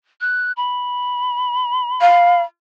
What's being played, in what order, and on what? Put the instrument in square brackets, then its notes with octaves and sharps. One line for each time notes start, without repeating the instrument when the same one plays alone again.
[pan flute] F#6
B5
[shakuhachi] F5